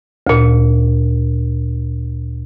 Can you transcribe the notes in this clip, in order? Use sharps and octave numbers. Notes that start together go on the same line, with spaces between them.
D2 A#2